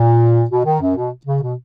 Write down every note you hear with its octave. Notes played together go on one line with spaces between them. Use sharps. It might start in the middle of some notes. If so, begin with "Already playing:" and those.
Already playing: A#2
B2
D#3
F#2
B2
C#3
B2